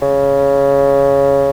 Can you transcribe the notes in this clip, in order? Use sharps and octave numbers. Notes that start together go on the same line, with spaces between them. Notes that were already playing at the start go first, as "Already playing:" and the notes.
C#3